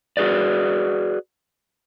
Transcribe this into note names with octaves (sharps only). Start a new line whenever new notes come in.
F#4 G#4 B4 D5